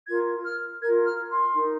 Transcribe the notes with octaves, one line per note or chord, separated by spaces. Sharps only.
F4 A#4 G#6
F6
F4 A#4 G#6
F6
C6
D#4 A#4